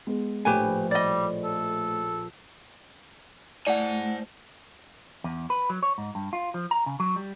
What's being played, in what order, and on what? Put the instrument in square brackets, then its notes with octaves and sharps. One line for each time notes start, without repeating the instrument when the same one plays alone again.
[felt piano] G#3 B3
[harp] A#1 [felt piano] A2 [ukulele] G4 B4 G#5
[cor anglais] G3 [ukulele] D5 D#5
[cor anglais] A4
[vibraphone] A3 [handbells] E4 F#5 [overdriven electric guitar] C5 G#5 [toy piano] D5
[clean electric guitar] E2
B4
F#3
C#5
G#2
G2
F4
F3
A#5
C#3
F#3
G3